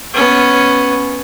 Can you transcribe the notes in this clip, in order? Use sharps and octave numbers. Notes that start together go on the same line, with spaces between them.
B3 C#4